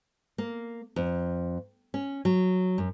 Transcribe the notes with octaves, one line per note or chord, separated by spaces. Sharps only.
A#3
F2
C#4
F#3
F#2